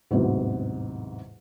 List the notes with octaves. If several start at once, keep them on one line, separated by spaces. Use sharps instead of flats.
A1 E2 G#2 C3 F#3